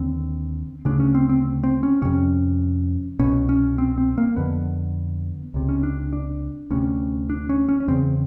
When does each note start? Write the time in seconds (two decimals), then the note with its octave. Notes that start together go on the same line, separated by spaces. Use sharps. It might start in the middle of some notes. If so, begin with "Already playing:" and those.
Already playing: D#2 D3 C4
0.85 D2 C#3 D4
1.00 C#4
1.15 C4
1.29 C4
1.63 C4
1.83 C#4
2.02 F2 C3 C#4
3.19 C2 B2 C#4
3.49 C#4
3.78 C4
3.98 C4
4.18 A#3
4.37 F2 D3 B3
5.54 C#2 C3
5.69 C#4
5.83 D4
6.13 D4
6.71 D2 C3 C#4
7.30 D4
7.49 C#4
7.69 C#4
7.80 C#4
7.88 E2 C#3 C4